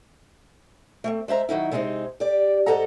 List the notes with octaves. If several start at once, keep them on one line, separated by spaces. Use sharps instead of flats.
A3 A#3 C4
G#3 C5 E5 A#5
D#3 F#3 D#4 E4
C3 G#3 C4 C#4 D#4
G4 D5
G#2 A4 D#5 F#5 A#5